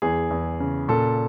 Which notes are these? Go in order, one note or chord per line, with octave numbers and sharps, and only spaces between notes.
E2 G#4
E2
C#3
A#2 A4